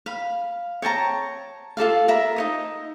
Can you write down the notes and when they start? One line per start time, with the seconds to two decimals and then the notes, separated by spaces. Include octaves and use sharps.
0.06 F5 B5
0.82 C#5 G5 A5 A#5
1.77 F4 A4 D5 F5
2.08 A#4 E5 B5
2.36 D#4 C#5 D#6